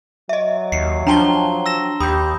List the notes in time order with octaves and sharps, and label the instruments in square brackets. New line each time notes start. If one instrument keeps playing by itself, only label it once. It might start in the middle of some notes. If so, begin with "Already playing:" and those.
[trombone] F#3 [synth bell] D#5 E5
[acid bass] D#2 [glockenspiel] C7 C#7
[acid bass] F3 [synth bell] D4 G5 A5 [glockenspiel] A#5 C6 G7
[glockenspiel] E6 A#6 E7
[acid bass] D#2 [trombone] G4 [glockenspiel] B5 [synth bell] D#6 G6